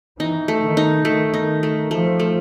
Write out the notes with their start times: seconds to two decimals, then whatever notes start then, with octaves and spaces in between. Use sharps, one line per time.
0.19 E3 D#4
0.48 A3
0.63 D#3
0.77 D#4
1.05 D#3 A3
1.34 D#4
1.63 A3
1.91 F3 A3
2.20 A3